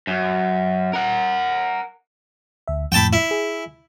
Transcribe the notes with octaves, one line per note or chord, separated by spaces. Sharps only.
F#2
A#4 F#5
D2 E5
F2 A2 G5 A5 B5
E4
G#4